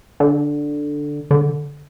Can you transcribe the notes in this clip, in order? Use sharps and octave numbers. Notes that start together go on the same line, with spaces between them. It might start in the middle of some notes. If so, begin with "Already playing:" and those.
D3
D3